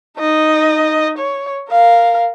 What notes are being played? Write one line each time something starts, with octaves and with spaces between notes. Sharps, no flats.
D#4 D#5
C#5
A#4 F5